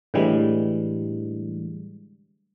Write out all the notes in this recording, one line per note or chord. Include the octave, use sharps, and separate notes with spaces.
A2 D3 E3 G3 G#3